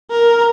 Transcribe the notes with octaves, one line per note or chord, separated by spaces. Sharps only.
A#4